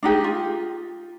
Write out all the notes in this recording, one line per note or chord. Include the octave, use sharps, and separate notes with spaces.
D4 D#4 G4 G#4
F4